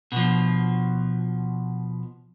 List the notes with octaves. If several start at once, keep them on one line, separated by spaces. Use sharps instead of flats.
B2 F3